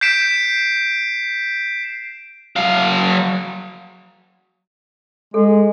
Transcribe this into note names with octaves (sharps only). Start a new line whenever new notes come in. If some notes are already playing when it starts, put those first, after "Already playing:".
G6 B6 C7 D7 E7
F#3 F5
G#3 A4